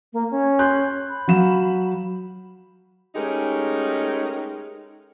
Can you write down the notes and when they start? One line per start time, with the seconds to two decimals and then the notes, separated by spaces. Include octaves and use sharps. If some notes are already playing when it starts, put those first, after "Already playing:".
0.13 A#3
0.31 C#4
0.59 C6 F#6 G6
1.09 B5
1.28 F#3 F5 E7
3.15 G#3 A3 C#4 D#4 G4 A#4